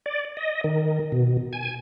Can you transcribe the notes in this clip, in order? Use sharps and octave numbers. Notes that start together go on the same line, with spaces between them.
D5
D#5
D#3
B2
G#5